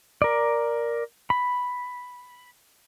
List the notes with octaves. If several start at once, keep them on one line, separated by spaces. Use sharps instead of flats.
A#4 D5
B5